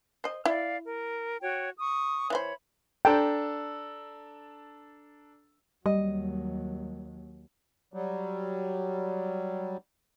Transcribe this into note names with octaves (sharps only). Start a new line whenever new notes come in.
C5 D#5
E4 D5 F5
A#4
F#4 C#5 G5
C#6 D#6
E3 F4 C5 C#5 B5
D4 A4 G5 A#5
D#2 F#3 G3 D#5
F#3 G3